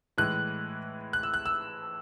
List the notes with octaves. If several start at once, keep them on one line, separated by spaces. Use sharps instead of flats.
A2 E3 G#3 F#6
F#6
E6
F#6
E6